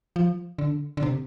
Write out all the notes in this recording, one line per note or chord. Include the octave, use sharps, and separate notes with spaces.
F3
D3
D3
C3